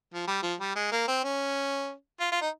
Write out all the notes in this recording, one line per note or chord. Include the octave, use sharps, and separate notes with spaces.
F3
G3
F3
G3
G#3
A#3
C4
C#4
F4
F4
D#4